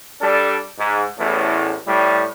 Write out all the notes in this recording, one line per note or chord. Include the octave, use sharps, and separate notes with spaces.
G3 D4 A4
G#2
A1 E2 A2
A2 G3